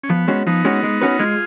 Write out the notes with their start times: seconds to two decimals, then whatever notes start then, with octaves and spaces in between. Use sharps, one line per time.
0.03 C#4
0.09 F3 B3
0.28 G#3 C#4 F#4
0.47 F3 B3 D#4
0.65 G#3 C#4 F#4
0.83 G#3
1.01 C#4 F#4 B4
1.19 G#3 F4 G#4